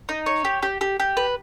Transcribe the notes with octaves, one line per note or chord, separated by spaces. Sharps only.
D#4
C#5
G4
G4
G4
G4
B4